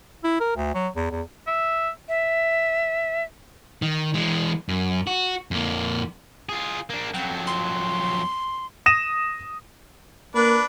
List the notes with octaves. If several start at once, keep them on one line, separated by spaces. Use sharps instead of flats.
E4
A#4
D2
F#3
E2
E2
E5
E5
D#3
E3 G#3
F#2
F#4
F2 A#3
F4 G#4
A#3 D4
F2 F#3 G5
C6
D#6 A#6 D#7 E7
A#3 D4 B4